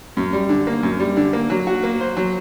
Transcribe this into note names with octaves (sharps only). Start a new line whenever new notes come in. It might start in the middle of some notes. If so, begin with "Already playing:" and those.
F#2
G3
D3
A#3
F#2
G3
D3
A#3
F#3
F#4
A#3
C5
F#3